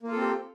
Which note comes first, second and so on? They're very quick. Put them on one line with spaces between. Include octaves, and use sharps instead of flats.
A#3 F4 A4 C4 G4